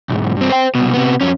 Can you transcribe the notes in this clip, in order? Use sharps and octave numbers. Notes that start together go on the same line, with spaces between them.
B1 G#2
G2 C4
C5 G5
C2 B2
C3 B3
F2 C#4